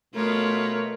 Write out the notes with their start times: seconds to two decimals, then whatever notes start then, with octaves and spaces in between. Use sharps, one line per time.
0.14 B2 A3 B3 F4 A#4 C#5